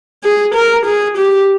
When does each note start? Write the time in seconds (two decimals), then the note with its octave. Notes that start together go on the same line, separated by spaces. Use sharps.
0.24 G#4
0.55 A#4
0.86 G#4
1.18 G4